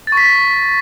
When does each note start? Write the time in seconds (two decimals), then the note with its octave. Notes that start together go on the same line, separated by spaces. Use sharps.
0.07 A6
0.12 C#6
0.17 B6